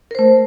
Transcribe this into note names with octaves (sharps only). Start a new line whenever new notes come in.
A3 A#4 C5